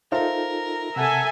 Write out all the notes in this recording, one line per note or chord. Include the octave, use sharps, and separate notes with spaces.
D#4 F4 A4 A#4 C5 E5 F5
C3 A4 E5 F#5 G#5 A5